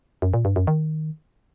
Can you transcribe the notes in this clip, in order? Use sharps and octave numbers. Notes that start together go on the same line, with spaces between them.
F#2
A#2
G2
F#2
D#3